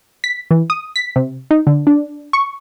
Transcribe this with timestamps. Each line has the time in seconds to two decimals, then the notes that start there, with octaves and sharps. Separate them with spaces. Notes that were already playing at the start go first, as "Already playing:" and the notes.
0.24 B6
0.51 E3
0.70 D#6
0.96 B6
1.16 C3
1.51 D#4
1.67 D3
1.87 D4
2.33 C#6